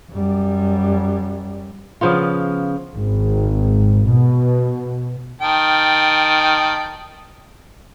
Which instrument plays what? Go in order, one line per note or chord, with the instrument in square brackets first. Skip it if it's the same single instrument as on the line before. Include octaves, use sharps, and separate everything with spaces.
[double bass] F#2 G3
[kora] C#3 F3 B3 F4
[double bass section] G#1
B2
[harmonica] D#3 G5 A5